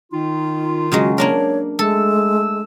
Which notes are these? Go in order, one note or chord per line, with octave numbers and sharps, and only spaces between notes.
D#3 D#4 F4
C#3 F#3 G#3 F#4
A#3 D4 A#4 C#5
G#3 A3 A4 E6